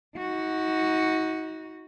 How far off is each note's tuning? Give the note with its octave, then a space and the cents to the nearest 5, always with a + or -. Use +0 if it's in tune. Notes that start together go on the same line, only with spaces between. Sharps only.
D#4 +35 F#4 +0